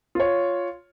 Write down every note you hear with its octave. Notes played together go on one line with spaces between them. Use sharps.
F4 C#5